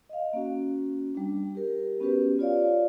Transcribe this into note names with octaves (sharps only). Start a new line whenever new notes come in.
D#5 F5
A#3 C#4 F#4
G3 D4
G4 A#4
B3 C#4 F#4 G4 B4
F4 C#5 D5 F5